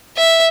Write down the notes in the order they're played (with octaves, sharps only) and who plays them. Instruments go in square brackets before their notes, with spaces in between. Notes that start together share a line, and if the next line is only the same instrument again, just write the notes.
[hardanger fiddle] E5